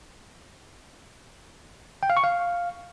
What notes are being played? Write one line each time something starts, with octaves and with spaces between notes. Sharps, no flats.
G5
F5
C#6
F5